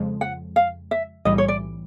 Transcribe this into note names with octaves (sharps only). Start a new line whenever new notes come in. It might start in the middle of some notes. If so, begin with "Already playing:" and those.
Already playing: F2 C#3 F3 G#3
F#5
F5
E5
B1 A2 E3 G3 D#5
C#5
D5